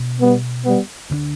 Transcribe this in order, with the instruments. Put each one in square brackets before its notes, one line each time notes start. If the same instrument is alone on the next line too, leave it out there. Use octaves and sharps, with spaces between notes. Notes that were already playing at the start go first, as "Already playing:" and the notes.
Already playing: [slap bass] B2 D4
[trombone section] G3 B3
G3 B3
[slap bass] D2 D3 A#3 D4